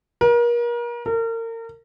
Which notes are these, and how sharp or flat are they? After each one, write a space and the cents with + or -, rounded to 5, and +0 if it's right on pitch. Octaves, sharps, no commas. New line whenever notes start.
A#4 +35
A#4 -35